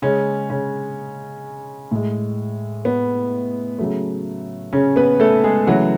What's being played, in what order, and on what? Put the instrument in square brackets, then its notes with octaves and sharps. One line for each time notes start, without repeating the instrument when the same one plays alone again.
[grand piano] C#3 G#3 C#4
C#3 C#4
A2 G#3
B3
C#3 F#3 A3
C#3 C#4
B3 B4
A3 A4
G#3 G#4
C#3 E3 F#3 A3 F#4